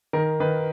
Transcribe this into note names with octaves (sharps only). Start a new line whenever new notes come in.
D#3 A#4
D#3 B4